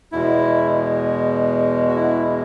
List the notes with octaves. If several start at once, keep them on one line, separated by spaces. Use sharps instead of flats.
E2 B2 G#3 E4
F#4
E4